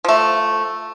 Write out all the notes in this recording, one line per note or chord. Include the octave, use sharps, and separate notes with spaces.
F3 A3